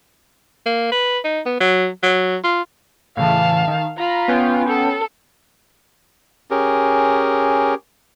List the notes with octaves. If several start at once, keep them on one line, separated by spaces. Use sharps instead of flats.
A#3
B4
D#4
B3
F#3
F#3
F4
A2 C#3 E3 F5 A5
D#3
F4 A#5 B5
B3 C#4 G5
A4
C#4 G4 G#4 A#4